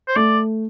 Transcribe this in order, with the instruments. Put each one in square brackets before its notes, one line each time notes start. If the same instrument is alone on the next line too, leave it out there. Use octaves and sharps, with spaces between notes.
[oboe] C5
[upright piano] A3 [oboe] D5